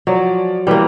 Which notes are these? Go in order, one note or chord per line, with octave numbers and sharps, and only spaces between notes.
F3 F#3 C#5 D5
E2 E3 G3 A#3 B4